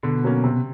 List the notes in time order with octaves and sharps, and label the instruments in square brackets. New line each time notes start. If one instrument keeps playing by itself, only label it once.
[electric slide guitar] B2 [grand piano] D3
[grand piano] F#3 A#3 C#4
C3